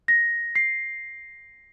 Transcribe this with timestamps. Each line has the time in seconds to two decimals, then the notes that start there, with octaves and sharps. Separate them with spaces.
0.08 A#6
0.55 C7